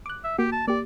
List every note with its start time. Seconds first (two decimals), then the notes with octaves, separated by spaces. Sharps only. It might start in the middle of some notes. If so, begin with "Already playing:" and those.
0.06 D6 F#6
0.24 E5
0.38 A#3 F#4 G4
0.52 A5
0.68 A#3 G4 D5